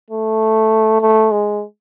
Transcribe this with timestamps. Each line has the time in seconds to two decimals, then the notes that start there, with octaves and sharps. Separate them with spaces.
0.10 A3
1.01 A3
1.32 G#3